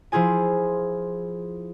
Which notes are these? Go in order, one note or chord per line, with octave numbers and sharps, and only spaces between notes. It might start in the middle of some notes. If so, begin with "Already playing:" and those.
F3 E4 F4 G#4 G#5